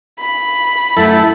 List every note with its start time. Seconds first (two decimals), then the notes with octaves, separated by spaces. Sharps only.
0.19 B5
0.97 F#2 A3 E4 A4